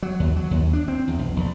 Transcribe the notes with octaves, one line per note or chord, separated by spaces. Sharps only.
F#3
D#2
F#3
D#2
D4
C4
E2
B1
A#1